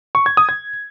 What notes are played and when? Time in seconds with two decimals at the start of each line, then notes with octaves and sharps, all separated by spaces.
0.15 C#6
0.26 G#6
0.37 D#6
0.49 G#6